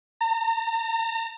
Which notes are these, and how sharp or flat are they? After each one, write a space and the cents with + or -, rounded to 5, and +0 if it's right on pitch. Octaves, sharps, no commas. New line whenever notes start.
A#5 -40